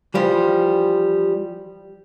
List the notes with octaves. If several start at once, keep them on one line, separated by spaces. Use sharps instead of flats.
E3 F3 G3